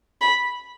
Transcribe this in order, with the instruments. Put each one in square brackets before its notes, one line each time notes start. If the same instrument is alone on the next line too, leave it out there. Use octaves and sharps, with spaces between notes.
[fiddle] B5